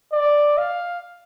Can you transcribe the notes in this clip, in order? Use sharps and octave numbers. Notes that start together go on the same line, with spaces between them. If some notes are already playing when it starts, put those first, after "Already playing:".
D5
F5